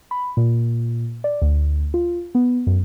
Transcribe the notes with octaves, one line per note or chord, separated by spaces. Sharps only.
B5
A#2
D5
D2
F4
B3
F#2